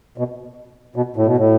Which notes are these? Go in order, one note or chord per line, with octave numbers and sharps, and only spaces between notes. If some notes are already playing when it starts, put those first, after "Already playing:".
B2
B2
A2
B2
A2